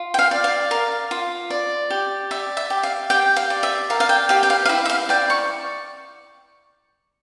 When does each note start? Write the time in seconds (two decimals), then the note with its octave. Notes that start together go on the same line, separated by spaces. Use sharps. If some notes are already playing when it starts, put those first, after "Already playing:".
Already playing: F4
0.14 G5
0.19 F5
0.31 D5
0.44 F5
0.71 A#4 F5
1.11 F4
1.50 D5
1.90 G4
2.31 D5 E5
2.57 E5
2.70 G4
2.83 F5
3.10 G4 G5
3.36 F5
3.50 D5
3.63 E5
3.90 A#4 F5
4.00 F5
4.09 G5
4.29 G4 F5
4.43 G5
4.50 F5
4.65 F5
4.69 E4 E5
4.85 E5
4.89 F5
5.09 D5 G5
5.30 C#6